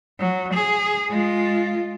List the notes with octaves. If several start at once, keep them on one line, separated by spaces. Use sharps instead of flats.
F#3
G#4
G#3 F4